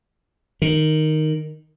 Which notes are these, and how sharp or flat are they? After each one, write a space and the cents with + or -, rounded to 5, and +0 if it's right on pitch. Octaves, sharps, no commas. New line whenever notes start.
D#3 -5